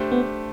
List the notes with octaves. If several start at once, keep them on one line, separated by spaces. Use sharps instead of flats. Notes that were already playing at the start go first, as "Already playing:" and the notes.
Already playing: A3 D4 G4 C5
B3